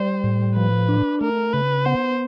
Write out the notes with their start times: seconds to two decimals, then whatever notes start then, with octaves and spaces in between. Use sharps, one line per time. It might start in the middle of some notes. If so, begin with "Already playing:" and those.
Already playing: G3 C5
0.24 A2
0.56 F3 B4
0.89 D4
1.21 A3 A#4
1.53 C#3 B4
1.85 B3 C5